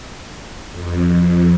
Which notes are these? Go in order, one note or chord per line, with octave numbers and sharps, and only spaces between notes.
F2